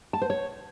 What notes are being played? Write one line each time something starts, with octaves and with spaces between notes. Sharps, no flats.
A5
C5
C#5